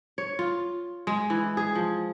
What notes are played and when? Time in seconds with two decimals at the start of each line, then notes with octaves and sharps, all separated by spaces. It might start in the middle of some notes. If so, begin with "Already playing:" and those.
0.18 C#5
0.39 F4
1.07 G#3
1.30 E3
1.57 G#4
1.75 F3